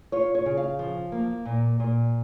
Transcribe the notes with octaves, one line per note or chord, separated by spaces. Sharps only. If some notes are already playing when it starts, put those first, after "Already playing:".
F4 C#5
C#5
C#3
F5
F3
A#3
A#2
A#2